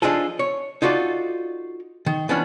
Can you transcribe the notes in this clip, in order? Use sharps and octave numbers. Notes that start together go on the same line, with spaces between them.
F3 D4 D#4 F4 G#4 A4
C#5
D#4 F4 F#4 A4 D5
D#3
E3 F3 G3 B3 C#4 D4